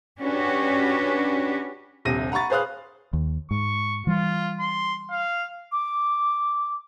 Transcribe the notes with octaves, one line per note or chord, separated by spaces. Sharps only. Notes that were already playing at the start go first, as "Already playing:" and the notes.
C#4 D4 F#4 G4 B4
D#1 A#1 C3 A#6 D#7
F#5 A#5 B5 C#6 A6
G#4 B4 C5 F5 D#6 F#6
D#2
G#2 C#6
E3 G3 F4
C6
F5
D6